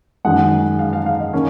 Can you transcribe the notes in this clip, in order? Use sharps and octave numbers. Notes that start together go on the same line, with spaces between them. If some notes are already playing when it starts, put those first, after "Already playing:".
F#2 D#3 G#3 F#5
F5
F5
F5
D#5
D#3 A#3 C#4